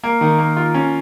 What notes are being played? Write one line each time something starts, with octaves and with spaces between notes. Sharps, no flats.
A#3
D#3
A#3
F4
C#4